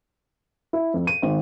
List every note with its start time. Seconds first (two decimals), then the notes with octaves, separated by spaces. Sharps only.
0.73 E4
0.94 F2
1.07 D#7
1.22 G#1